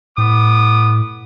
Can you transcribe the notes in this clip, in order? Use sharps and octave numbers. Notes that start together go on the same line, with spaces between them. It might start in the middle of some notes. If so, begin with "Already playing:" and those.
A2 B3 D6 D#6